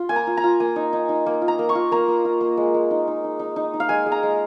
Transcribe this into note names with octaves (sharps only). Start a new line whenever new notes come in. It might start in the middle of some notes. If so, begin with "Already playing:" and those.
Already playing: F4
A#3 G#5
A#5
F4
A#5
F4
A#3 G#5
D#4
D#4
D#4
A#3
F4
A#5
A#3
C#6
F4
A#3 A#5
A#3
F4
A#3
G#3
G#3
D#4
D#4
D#4
D#4
D#4
D#4
F5
G#3 G#5
G#3
A#5
G#3